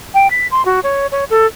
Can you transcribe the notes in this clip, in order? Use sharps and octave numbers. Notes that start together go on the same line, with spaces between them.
G5
B6
C6
F#4
C#5
C#5
A4